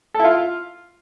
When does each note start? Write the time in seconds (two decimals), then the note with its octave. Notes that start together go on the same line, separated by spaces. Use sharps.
0.14 A4
0.19 E4
0.24 F4